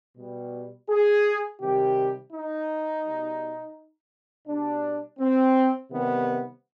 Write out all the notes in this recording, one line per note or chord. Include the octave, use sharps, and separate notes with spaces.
B2 G3
G#4
C3 D#3 G3 G4
D#4
B2 G3
B2 G3 D4
C4
C3 D#3 G3 B3